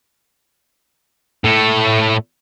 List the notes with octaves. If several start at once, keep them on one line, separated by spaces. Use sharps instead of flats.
A2 A3